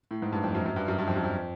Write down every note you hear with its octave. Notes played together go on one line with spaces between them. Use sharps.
A2
G#2
G2
F2
F#2
F#2
G2
F#2
G2
F2
F#2
F2